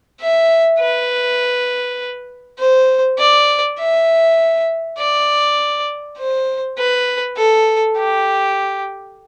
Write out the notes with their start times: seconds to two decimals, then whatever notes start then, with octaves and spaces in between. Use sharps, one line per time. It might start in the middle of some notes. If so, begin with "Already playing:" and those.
0.20 E5
0.79 B4
2.59 C5
3.19 D5
3.79 E5
4.98 D5
6.18 C5
6.78 B4
7.37 A4
7.97 G4